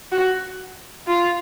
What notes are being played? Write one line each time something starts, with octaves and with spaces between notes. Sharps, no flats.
F#4
F4